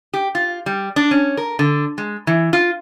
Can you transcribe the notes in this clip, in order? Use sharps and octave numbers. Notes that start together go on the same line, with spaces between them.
G4
F4
G3
D4
C#4
A#4
D3
G#3
E3
F4